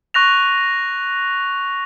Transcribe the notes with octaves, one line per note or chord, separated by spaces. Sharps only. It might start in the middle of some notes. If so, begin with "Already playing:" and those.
C#6 F#6 A#6 F7